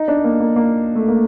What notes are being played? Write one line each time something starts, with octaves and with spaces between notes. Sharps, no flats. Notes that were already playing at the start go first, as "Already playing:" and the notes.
Already playing: D#4
D4
A#3
A#3
A#3
A3
A#3